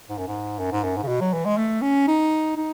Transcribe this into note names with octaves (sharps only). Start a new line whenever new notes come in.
G#2
F#2
G#2
F#2
G#2
F#2
G#2
C#3
B2
F#3
E3
G#3
A3
C#4
D#4
D#4